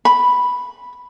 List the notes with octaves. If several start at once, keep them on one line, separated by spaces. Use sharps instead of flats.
B5